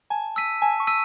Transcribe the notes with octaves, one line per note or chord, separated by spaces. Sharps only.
G#5 A5
E6 B6 D#7
G#5 A5
C#6
E6 B6 D#7